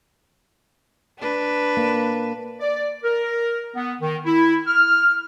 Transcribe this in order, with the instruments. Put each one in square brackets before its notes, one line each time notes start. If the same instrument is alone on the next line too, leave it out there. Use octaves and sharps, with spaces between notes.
[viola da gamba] D4 B4
[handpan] A#3
[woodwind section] D5
A#4
B3
D#3
E4
F6